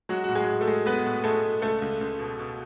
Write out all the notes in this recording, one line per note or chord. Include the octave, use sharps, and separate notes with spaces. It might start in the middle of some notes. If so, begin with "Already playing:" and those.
F#3 G#3 F#4
A2 F#4
G#3 G#4
A2
A3 A4
G#3
G#3 B3 B4
A2
G#3 A3 A4
G#3
C#2 A3 A4
C#2
C#2
B2
B2